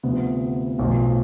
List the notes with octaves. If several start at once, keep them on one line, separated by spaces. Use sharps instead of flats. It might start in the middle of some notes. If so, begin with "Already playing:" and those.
D2 C3 F3 B3
B1 A2 F3